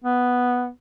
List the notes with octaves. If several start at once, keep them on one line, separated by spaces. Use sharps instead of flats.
B3